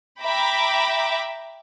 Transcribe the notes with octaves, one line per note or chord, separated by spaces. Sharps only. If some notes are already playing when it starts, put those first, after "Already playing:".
E5 G5 A#5 B5 D6